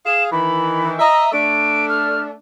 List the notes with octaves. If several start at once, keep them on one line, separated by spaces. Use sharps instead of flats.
G#4 F5 E7
D#3 E3 B5
D#5 E5 A#5
A3 D4 D7
F6